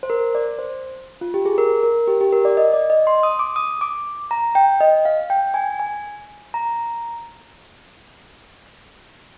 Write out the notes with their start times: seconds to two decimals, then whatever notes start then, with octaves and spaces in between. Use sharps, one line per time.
0.03 C5
0.10 A#4
0.35 D5
0.59 C5
1.21 F4
1.34 G4
1.45 G#4
1.58 A#4
1.83 A#4
2.07 G4
2.21 G4
2.32 A#4
2.45 D5
2.57 D#5
2.74 D5
2.90 D#5
3.07 C6
3.23 D#6
3.39 D6
3.56 D#6
3.81 D6
4.31 A#5
4.55 G5
4.81 D#5
5.05 F5
5.30 G5
5.54 G#5
5.80 G#5
6.54 A#5